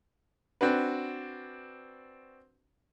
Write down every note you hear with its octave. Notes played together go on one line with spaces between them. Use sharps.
C4 D4 F#4 B4